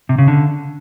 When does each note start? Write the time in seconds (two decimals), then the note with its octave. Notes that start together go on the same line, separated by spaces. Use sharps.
0.09 C3
0.18 C#3
0.28 D3